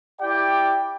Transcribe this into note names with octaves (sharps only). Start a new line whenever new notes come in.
E4 G4 D5 G5